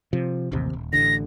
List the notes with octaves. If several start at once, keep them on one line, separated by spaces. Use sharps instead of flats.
C3 F3
A1 D#2 C3
D#1
A1 D3 A#6